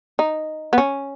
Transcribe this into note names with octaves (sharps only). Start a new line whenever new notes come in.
D#4
B3
C#4